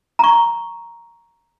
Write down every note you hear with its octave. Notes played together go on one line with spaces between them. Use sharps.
A#5 C#6